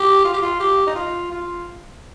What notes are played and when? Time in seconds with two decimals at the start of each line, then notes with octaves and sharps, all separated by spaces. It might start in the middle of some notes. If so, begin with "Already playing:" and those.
Already playing: G4
0.24 F4
0.33 G4
0.42 F4
0.60 G4
0.87 D#4
0.95 F4
1.31 F4